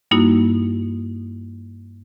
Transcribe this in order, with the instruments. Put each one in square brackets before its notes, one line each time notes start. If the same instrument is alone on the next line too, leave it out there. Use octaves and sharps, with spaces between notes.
[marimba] G2 G3 A#3 D#4 E4 F#4